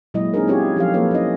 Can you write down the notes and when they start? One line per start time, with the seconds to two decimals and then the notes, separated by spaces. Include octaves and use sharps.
0.14 A#2 F#3 G#3 E4 D#5
0.34 C4 D4 D#4 G#4 A#4
0.48 C#4 E4 F4 G4 G#4 C#5
0.77 F3 F#3 G4 A4 F5
0.94 F3 A#3 A4 B4 C#5
1.11 C#4 E4 D#5